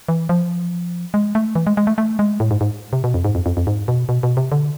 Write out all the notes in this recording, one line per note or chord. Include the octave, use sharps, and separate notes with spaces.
E3
F3
G#3
A3
E3
G#3
G#3
A3
A3
G#3
A2
G#2
G#2
C3
B2
F2
G#2
F2
F2
F2
G#2
B2
B2
B2
C3
D3